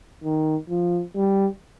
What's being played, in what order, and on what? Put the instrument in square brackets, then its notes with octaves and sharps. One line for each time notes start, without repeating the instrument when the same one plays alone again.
[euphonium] D#3
F3
G3